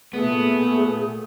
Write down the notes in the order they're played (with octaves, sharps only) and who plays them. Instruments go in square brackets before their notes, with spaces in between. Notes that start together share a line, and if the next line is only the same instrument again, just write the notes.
[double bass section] A#2 A3 [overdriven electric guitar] B3 [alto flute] G#4